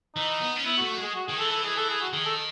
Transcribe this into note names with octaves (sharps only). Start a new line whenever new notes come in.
E3 D#4
B3
C#4
B3 E4
F#4
A3
F#4
G#3
G#4
F#4
D#3 G#4
E3 A4
A4
G#4
A4
G#4
F#4
D#3 G#4
A4